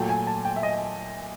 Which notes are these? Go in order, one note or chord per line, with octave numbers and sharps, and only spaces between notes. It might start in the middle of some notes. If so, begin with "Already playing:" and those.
Already playing: A#2 F#3 A3 G5
G#5
A5
G5
E5
D#5